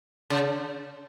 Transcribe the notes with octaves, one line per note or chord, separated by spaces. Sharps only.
C#3